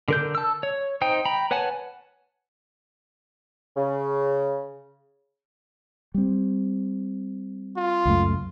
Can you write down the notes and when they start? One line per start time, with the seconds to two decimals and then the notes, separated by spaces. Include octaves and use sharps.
0.08 D3 A#4 G6
0.35 A5 E6
0.63 C#5
1.01 D#4 C5 G5
1.25 G5 A#5 B5
1.51 B4 C#5 F#5 G#5 A5
3.77 C#3
6.14 G3 C4
7.77 F4
8.05 C#2 F#2 A3